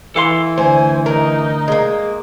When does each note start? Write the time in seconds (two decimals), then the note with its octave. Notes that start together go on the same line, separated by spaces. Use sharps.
0.16 E3 A4 F5 C6
0.58 D2 C5 G#5
1.06 D#4 A#4
1.68 G#3 A#3